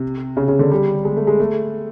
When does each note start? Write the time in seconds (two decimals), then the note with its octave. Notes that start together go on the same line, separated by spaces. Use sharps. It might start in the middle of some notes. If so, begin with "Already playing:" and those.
Already playing: C3
0.37 C#3
0.48 C#3
0.59 D3
0.71 G3
1.05 G#3
1.17 A3
1.27 G#3
1.40 A3